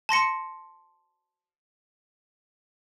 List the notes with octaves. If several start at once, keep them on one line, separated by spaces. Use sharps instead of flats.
A5 C6 A#6 C#7